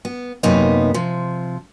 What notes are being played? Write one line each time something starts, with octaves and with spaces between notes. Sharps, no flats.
B3
F#2 C3 A#3 B3 D#4
C3 F3